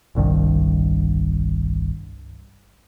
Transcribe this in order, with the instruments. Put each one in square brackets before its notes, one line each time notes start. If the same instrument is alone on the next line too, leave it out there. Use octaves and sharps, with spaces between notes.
[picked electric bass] G1 C2 G2 D#3